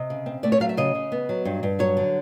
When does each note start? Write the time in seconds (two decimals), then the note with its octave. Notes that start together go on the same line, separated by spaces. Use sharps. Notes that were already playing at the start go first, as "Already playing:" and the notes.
Already playing: C3 D#5
0.10 C#3
0.26 C4
0.43 A3 D5
0.52 C#5
0.60 F#3 F5
0.69 E5
0.77 C#3 D#5
0.95 C#3
1.12 B3
1.29 F#3
1.45 G2
1.63 G2
1.79 F#3 C#5
1.97 D3